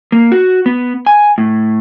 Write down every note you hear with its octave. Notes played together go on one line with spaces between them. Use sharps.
A#3
F#4
B3
G#5
A2